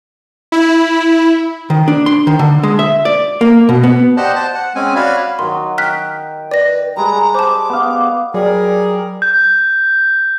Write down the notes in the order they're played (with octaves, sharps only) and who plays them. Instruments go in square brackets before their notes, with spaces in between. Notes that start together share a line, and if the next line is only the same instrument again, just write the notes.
[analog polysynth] E4
[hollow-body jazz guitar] D#3
D4
C6
D#3
D3
G#3
E5
D5
A#3
B2
B3
[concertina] G4 C5 D5 D#5 F#5 A5
C5 A5
F#5
G#3 C4 C#4 G#5
F#4 C#5 D5 F5 B5
[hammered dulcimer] D#3 F#3 [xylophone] C6
[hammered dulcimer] G5 [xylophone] F6 F#6 B6
[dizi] B4 [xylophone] D5 A#6
[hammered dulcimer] G3 G#3 [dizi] A#5
[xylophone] C5 A5 [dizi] D6
[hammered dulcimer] B3 F5
[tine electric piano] F#3 [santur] G3 [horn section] G#4 A#4
[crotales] G6